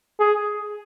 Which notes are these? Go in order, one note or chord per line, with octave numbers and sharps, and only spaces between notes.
G#4